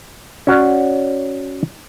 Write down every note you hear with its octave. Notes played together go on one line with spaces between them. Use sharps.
C#4 F#4 C#5 D5